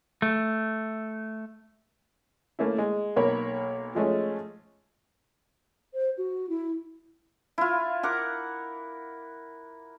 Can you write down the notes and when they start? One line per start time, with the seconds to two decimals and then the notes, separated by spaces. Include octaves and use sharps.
0.22 A3
2.59 A3 A#3 C#4 E4
2.78 G#3
3.16 B1 A#3 A#4 C#5 B5
3.95 F3 G#3 A3 C#4
5.94 C5
6.17 F#4
6.49 E4
7.58 E4 F4
8.03 A#4 F#5 D6